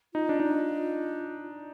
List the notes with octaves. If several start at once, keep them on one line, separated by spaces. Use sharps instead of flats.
D#4 F4
D4
D#4